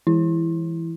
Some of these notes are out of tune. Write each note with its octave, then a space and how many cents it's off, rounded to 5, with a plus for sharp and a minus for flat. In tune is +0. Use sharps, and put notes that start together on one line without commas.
E3 +10 E4 +0